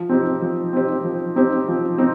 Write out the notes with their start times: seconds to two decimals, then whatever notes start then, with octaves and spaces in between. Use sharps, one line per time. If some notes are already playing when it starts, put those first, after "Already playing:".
Already playing: F3
0.09 C4 D#4 G4 C5
0.42 F3
0.73 C4 D#4 G4 C5
1.04 F3
1.36 C4 D#4 G4 C5
1.68 F3
1.98 C4 D#4